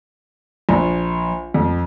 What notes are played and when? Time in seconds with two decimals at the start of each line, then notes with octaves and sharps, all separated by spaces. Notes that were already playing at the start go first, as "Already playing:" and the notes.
0.69 A#1
1.54 F2